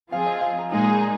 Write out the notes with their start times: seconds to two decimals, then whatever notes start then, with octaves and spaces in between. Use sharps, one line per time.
0.12 F3 C4 F4 G#4 F5
0.26 D#5
0.41 F5
0.58 A#5
0.70 A#2 G#3 D#4 G#4 G#5
0.84 A#5
0.99 A#5